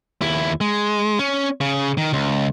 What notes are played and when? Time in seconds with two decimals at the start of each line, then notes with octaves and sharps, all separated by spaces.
0.22 D#2 E4
0.61 G#3
1.19 C#4
1.61 C#3
1.97 D#3
2.13 C#2